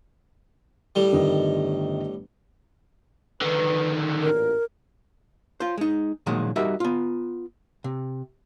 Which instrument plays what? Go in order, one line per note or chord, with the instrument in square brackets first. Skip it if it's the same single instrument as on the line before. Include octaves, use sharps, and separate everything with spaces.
[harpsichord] A2 G3
[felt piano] G1 D#3 D#5
[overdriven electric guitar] D3 D#3 [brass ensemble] B4
[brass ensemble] A1 E2 A#2 [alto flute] A#4
[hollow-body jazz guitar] F4 C5
G#3 D#4
A#2 D#3 F3 F#3 G#3
G3 D#4 F#4 A#4 D#5 E5
B3 F4
C3